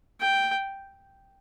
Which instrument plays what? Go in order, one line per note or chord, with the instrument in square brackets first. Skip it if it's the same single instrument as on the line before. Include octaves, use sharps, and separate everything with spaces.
[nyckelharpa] G5